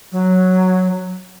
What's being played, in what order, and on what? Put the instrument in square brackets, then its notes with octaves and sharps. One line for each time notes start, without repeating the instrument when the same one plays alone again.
[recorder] F#3